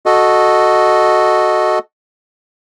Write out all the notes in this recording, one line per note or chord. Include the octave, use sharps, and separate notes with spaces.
F#4 A4 D#5